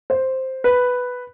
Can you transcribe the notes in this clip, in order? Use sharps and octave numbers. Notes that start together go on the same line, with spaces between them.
C5
B4